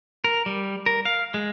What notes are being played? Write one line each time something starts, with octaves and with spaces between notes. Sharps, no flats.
A#4
G3
A#4
F5
G#3